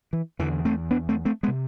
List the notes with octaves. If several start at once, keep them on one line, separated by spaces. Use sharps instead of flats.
E3
E2 D3 E3
A3 C4
B3 D4
A3 C4
A3 C4
G#3 B3
C3